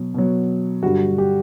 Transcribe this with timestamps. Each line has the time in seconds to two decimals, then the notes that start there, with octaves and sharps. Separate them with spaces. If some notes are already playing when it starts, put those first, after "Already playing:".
Already playing: B2 F#3
0.14 B2 F#3
0.83 G2 D3 G3 F#4
1.18 G4